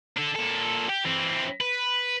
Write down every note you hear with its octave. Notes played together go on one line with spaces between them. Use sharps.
D4 A4
A#2 A4
G4
E3 C4
B4